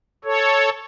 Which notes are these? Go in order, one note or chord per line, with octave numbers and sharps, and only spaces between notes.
A4 C#5